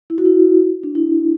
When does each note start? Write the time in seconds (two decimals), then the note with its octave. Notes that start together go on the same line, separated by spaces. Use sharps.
0.10 E4
0.18 F#4
0.25 E4
0.83 D4
0.95 E4